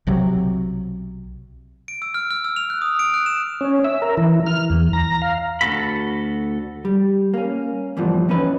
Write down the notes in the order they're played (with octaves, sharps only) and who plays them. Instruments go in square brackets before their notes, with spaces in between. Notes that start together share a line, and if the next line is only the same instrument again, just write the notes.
[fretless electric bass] B1 C3 F#3
[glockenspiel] D7
E6
F6
F6
E6
F7
F#6
D#6
D7
F#6
E7
[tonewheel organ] C#4
E5
A#4
E3
F6
E2
A#5
F5
[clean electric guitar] D2 G2 F#4 A4 B5
[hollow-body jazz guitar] G3
A#3 C#4
E2 G2 A#2 E3 F3
E3 C#4 D#4 B4